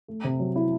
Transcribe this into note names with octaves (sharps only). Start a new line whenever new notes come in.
A3
C3
F#3
E4